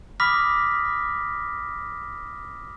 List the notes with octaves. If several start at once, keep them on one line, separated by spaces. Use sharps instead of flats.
B5 D6 D#6 F6 A#6 B6